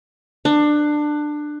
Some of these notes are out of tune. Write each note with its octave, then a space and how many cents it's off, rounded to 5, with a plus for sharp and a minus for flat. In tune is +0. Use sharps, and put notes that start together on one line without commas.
D4 +20